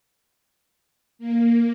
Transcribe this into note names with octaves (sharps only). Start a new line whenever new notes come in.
A#3